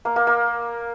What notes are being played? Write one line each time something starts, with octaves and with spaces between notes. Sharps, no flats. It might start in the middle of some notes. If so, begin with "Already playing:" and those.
A#3
A#3
A#3